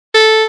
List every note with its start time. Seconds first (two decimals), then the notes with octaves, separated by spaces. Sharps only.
0.14 A4